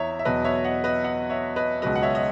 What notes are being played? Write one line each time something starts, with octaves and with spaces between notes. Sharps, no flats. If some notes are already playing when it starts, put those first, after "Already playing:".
Already playing: E2 E3 C#5 E5 A#5
E5
E2 B2 F#3 B4 D#5
C#5 E5
D#5 F#5
B4 D#5
D#5 F#5
C#5 E5
B4 D#5
C#2 B2 F#3 B4 D#5
F#5
C#5 E5
D#5